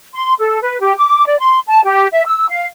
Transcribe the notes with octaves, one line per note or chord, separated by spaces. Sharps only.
C6
A4
B4
G4
D6
D5
C6
A5
G4
E5
E6
F5